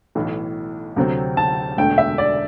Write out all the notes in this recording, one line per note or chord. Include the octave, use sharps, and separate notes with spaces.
B1 A2 E3
D2 C3 F#3 C4
A5
E1 D2 D3 A3 G5
E5
D5